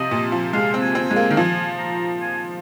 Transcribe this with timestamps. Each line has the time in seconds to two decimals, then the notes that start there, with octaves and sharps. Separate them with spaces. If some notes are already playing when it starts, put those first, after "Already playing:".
Already playing: C3 F3 D#5
0.11 A#2
0.32 F3
0.53 G#3 F5
0.74 C4
0.81 G#5
0.95 C4
1.09 G#3 G#5
1.16 A#3
1.31 D#3
1.37 F3 G#5
1.79 A#5
2.21 G#5